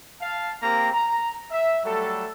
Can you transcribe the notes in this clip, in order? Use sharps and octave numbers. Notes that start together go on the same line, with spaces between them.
F5 A5
A#3 C4 G4 A#4 A#5
A#5
E5
F#3 G3 A3 A4